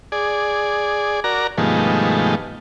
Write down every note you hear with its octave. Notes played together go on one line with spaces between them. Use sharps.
G#4 D5
F#4 A#4 D5 A#5
G2 B2 D#3 F3 G#3 A3